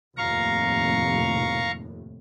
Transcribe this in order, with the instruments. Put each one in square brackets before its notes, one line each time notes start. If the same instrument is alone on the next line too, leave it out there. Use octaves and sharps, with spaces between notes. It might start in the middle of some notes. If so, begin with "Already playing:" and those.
[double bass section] F1 D#2 A2 [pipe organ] F5 A#5 C#6